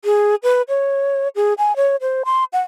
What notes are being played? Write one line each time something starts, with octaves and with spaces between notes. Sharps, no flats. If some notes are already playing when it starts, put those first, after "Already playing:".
G#4
B4
C#5
G#4
G#5
C#5
C5
C6
F#5